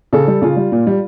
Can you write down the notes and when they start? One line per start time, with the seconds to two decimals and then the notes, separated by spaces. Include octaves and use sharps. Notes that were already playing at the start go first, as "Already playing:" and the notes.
0.13 C#3 A4
0.28 G3
0.42 C#3 F4
0.56 G3
0.72 A#2
0.87 G3